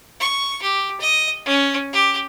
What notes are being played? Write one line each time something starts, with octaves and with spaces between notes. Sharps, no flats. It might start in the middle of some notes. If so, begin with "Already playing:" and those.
C#6
G4
D#5
C#4
G4